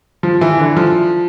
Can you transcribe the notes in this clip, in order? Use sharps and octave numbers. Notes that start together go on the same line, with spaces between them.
F3
E3
D3
F3